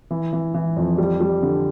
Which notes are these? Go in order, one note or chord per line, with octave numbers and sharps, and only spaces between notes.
E3
E3
E3
F2
G3
G3
D3